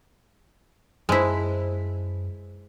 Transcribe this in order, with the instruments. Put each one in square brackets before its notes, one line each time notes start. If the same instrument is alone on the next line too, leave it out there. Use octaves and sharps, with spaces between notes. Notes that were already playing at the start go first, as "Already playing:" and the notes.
[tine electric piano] F#2 [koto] G#3 E4 [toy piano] B4 C5 A5